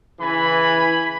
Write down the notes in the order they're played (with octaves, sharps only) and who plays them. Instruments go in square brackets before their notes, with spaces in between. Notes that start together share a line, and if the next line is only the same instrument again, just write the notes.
[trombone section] C#3 E3 [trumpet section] G#5 B5